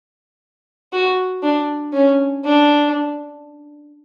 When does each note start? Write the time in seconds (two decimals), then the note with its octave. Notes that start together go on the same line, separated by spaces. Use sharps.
0.92 F#4
1.42 D4
1.93 C#4
2.44 D4